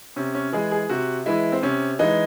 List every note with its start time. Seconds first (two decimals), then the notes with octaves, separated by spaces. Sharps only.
0.16 C3 C#4
0.35 C#4
0.53 E3 G#3 G#4
0.71 G#4
0.89 C3 F#4
1.26 E3 G#3 E4
1.52 C4
1.63 C3 C#4
1.99 E3 G#3 D#4